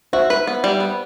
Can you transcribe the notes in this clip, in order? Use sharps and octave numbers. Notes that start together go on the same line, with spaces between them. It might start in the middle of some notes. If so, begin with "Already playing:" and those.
F#4 C5 E5
B4
B3
G3
B3